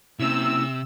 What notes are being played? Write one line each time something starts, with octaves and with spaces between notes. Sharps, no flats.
C3 A#3 C#4 E4 E6